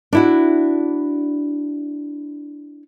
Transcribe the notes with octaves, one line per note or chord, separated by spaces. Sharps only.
D4 E4 F#4